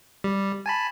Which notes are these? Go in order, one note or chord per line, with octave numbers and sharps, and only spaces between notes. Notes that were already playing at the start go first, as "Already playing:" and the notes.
G3
G#5 A5 B5